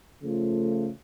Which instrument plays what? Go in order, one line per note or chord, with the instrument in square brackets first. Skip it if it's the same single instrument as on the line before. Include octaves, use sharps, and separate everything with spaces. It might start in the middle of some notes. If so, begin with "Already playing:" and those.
[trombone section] C#3 F3 A3 F4